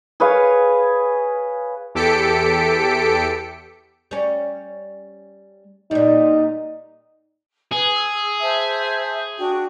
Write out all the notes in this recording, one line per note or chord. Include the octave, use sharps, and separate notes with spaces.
G#4 B4 C#5 F5
E2 G4 A4 B6 C#7 D7
G3 C#4
A#2 G3 D#4
G#4 B4 G#5
E6
C5 E5 A5
D4 F#4 G5